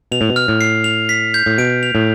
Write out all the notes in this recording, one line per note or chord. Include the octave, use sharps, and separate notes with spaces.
B2 F7
A2
B2
F6
A2
C7
F7
B6
G6
A2
B2 D7
F7
A2